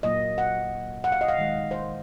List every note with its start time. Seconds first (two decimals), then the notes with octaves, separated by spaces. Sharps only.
0.03 A#2 F#3 A#3 D#5
0.38 F#5
1.04 F#5
1.12 F5
1.21 D#5
1.28 F5
1.38 D#3 G#3
1.71 C5